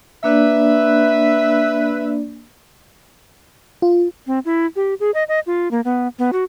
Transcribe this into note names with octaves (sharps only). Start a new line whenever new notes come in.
A#3 D4 B4 D5 E5
F4
C4
E4
G4
G#4
D#5
D#5
F4
A#3
B3
B3
F#4